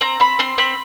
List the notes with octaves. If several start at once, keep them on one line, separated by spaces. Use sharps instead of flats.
C4 A#5
C4 B5
C4 C6
C4 B5